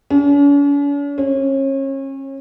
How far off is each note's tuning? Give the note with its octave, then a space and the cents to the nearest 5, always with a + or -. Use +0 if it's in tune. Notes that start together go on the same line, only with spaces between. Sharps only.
C#4 +45
C#4 -35